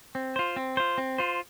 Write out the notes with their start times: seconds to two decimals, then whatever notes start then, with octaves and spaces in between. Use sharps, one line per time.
0.15 C4
0.36 F4 C5
0.56 C4
0.77 F4 C5
0.98 C4
1.18 F4 C5